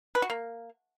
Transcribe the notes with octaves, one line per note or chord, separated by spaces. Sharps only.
B4
F#4
A#3